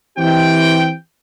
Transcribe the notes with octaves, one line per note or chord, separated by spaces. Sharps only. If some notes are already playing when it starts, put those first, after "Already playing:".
E3 C4 G4 G5